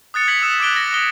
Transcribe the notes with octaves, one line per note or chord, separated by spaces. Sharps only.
D#6 F#6 A6 C#7
G#6 B6 F#7
D#6 E6 E7
D6 F#6 D7 G7
A#6
D#6 G7